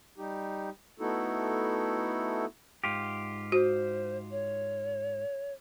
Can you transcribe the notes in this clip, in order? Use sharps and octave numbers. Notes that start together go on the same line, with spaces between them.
G3 D#4 G4
A3 B3 D#4 E4 F#4 A4
G#2 F4 G4
F#4 C5
C#5